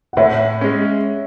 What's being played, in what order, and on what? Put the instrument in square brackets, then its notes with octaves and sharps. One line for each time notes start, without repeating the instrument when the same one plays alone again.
[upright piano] F#5
[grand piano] A2 [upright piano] C#5 E5
[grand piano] G#3 C#4